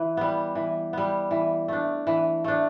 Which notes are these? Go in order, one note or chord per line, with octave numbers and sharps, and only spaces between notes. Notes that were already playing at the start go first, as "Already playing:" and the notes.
Already playing: E3
G3 B3
E3
G3 B3
E3
A3 D4
E3
A3 D4